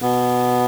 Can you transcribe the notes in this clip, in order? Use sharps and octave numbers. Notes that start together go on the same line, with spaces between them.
B2 B3